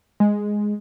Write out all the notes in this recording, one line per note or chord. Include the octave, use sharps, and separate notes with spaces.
G#3